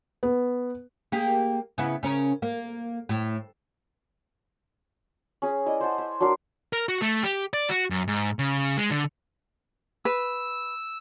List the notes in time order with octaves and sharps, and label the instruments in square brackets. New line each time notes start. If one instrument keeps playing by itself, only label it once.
[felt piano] B3
[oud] A#3 G4 G#4
C#3 B3 E4
C#3 C#4 A#4
A#3
A2
[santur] C#4 G#4
E4 D5 D#5
C5 F#5 A5
E5
F#3 D4 A#4 C6
[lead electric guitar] A#4
F#4
A3
G4
D5
F#4
F#2
G#2
C#3
G#3
D3
[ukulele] B4 [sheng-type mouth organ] E6